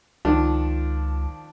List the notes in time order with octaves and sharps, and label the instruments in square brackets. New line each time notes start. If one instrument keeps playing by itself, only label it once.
[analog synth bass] C#2 [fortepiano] D#3 F3 D4